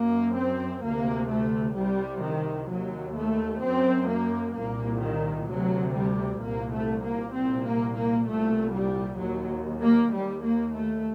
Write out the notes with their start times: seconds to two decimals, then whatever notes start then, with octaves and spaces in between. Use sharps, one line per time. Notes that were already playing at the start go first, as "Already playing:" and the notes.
Already playing: F#2 A#3
0.36 C4
0.82 D2 C3 A#3
1.29 A3
1.75 C2 C3 G3
2.22 D#3
2.69 D#2 F#3
3.15 A3
3.61 F#2 C4
4.08 A#3
4.54 C2 A#2 A#3
5.01 D#3
5.47 D2 C3 F#3
5.94 G3
6.40 C2 A#2 A#3
6.72 A3
7.02 A#3
7.33 C2 A#2 C4
7.64 A#3
7.95 A#3
8.26 C2 A#2 A3
8.73 G3
9.19 D#2 F#3
9.80 A#3
10.12 D#2 G3
10.43 A#3
10.74 A3